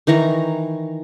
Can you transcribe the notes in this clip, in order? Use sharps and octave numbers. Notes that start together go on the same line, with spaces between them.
D#3 E3 A#5 C#6